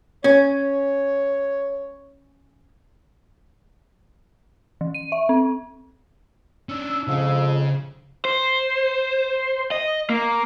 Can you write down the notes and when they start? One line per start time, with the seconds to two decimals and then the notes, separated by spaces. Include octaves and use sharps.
0.24 C#4 C#5
4.81 E3
4.94 D#7
5.12 E5
5.29 C4
6.69 C#4 D4 E6
7.08 F2 G#2 C#3 F3
8.25 C5
9.71 D#5
10.10 A#3